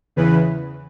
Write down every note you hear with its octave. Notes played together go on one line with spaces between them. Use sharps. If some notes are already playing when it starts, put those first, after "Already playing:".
E2 C#3 E3 B4